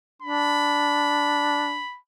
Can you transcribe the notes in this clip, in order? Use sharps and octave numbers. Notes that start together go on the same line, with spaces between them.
D4 B5